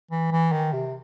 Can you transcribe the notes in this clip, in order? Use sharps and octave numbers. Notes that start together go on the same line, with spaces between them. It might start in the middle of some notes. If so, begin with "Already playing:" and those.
E3
E3
D#3
C3